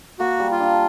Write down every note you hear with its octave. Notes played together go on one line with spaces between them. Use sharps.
A#3 F#4
G3
F4
D4